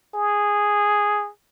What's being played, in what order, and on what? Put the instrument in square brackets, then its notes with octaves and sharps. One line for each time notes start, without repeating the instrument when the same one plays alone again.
[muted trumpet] G#4